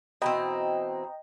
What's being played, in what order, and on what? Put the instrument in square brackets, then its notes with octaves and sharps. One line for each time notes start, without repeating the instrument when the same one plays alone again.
[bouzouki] B2 E3 C4 [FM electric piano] D#5 G5 A#5